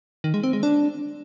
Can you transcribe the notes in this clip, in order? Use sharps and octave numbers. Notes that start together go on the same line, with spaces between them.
D#3
G#3
C4
G#3
D4